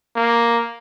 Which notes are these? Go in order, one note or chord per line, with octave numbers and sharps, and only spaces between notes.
A#3